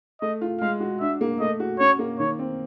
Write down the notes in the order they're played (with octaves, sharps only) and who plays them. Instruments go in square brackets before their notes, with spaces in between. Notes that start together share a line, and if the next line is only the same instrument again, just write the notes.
[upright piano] A3 [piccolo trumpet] D#5
[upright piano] F4
[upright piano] G#3 [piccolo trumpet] F5
[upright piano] F#4
[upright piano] D4 [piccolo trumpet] E5
[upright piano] A#3
[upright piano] A3 [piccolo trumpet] D#5
[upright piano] F#4
[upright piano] C#4 [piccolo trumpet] C#5
[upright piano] A#3
[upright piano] D#3 [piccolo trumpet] C#5
[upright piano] C4